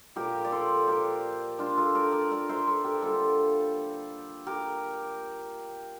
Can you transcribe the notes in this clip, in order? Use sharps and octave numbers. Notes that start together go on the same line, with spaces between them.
A#2 F3 A#3 G4 A#4
D5
A4 C5
G4 A#4
D4 F4
F4 A4
A#4 D5
A#4 D5
A#4 D5
C5 E5
A4 C5
G4 A#4
D3 G3 A#3 F4 A4
G4 A#4